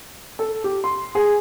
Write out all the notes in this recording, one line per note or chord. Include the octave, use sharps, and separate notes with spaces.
A4
G4
C6
G#4